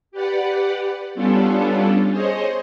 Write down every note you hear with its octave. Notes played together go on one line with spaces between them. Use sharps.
G4 B4 D5 F#5
G3 B3 C#4 D4 F4 A4
G#4 C5 C#5 D#5